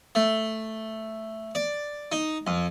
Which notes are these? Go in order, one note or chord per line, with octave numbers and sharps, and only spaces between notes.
A3
D5
D#4
F2